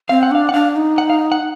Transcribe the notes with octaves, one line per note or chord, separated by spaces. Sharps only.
C4 F5
F#5
D4 F5
F#5
D4 F5
D#4
F#5
F5
F#5